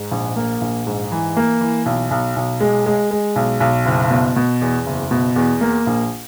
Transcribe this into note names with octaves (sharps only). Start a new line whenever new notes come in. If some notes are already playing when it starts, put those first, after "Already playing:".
Already playing: G#2
A#1
A#3
A#1
G#2
E3
A#3
E3
B1
B1
B1
G#3
G#3
G#3
B1
B1
F#1
B2
B2
E2
F#1
B2
E2
A#3
A#1